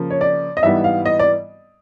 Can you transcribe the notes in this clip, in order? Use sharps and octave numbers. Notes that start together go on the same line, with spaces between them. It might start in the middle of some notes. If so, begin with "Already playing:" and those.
Already playing: C#3 F3 A#3
C#5
D5
D#5
G#2 E3 G3 B3 E5
F5
D#5
D5